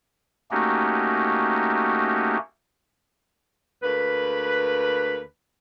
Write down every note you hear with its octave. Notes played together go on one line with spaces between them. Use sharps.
A3 A#3 C#4 D#4 F#4 G4
D2 A#3 B4